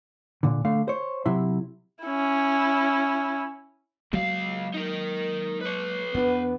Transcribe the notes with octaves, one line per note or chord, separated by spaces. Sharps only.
A#2 D3
D3 A3 F5
C5 C#5
C3 F#3 E4 C6
C#4 E4
C#2 F#3 G#3 A#3 F5
D#4 A#4
B4 C#5
E2 B3 D4